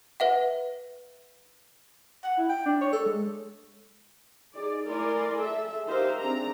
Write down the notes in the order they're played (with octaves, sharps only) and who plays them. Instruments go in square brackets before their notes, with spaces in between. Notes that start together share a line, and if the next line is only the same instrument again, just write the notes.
[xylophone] B4 E5 F#5
[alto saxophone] F#5
E4
G5
D4
C#5
A4
G#3
[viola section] D#4 G#4 D5
A3 E4 A#4 D5 G#5 C6
G#4 A4 E5
D#4 G4 A#4 C5 E5 F5
C4 D4 G#4 A#5